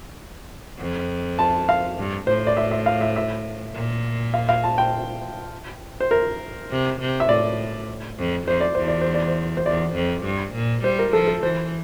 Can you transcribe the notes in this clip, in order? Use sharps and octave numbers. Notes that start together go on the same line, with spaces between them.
F2
A5
F5
G2
A2 C5
D5
E5
E5
F5
E5
E5
A#2
F5
F5
A5
G5
C5
A#4
C3
C3
E5
A2 D5
F2
F2 C5
D5
E2 C5
D5
C5
D5
C5
C5
E2 D5
F2
G2
A#2
G3 C5
A#4
F3 A4
A4
E3 C5